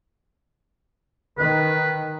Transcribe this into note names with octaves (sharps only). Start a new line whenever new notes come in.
D#3 B4